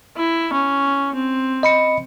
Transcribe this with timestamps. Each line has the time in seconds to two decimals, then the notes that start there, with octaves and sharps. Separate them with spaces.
0.17 E4
0.53 C#4
1.15 C4
1.63 D#5 B5 C#7